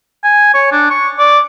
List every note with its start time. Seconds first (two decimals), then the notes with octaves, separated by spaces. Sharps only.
0.24 G#5
0.54 C#5
0.72 D4
0.90 C#6
1.18 D5